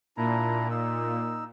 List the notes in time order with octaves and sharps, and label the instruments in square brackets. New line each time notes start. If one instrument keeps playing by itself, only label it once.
[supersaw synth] A#2 [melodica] D4 E4 A#5
[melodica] D#4 E6